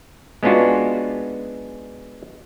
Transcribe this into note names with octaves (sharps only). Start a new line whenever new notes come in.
G#3 B3 C#4 D4 F4 F#4